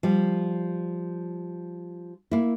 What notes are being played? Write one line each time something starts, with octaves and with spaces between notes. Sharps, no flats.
F3 G3
A#3 E4